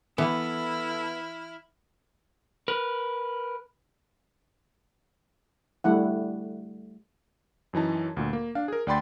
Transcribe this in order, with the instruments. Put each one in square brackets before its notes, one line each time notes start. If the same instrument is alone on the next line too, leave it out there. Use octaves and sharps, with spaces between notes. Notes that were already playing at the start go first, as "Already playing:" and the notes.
[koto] E3 [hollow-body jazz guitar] B3 [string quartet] E4 F6 [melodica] A4
[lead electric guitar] A#4 B4
[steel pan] G3 A3 E4 F#5
[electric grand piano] F#2 E3 D#4 A5
D2 A#2
A#3
D4 F5
G#4 A#4
D2 D5 G5 B5 C6 A6